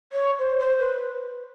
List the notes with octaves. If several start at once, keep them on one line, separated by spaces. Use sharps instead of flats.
C#5
C5
C5
B4